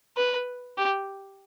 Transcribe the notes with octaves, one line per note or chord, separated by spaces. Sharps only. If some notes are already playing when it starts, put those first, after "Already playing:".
B4
G4